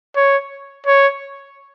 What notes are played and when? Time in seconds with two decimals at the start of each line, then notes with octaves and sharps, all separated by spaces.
0.16 C#5
0.86 C#5